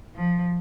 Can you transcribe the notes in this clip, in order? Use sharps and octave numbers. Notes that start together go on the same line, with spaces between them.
F3